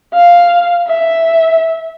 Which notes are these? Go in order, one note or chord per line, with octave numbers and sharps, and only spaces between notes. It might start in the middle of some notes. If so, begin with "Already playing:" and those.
F5
E5